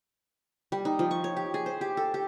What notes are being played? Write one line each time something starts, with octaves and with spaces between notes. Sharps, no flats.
G3
D#4
F3
C#6
C#5
G4
G#4
C5
G4
A4
G4